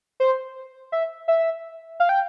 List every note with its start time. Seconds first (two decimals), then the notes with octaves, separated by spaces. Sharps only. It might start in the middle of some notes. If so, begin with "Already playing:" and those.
0.20 C5
0.92 E5
1.28 E5
2.00 F5
2.09 G5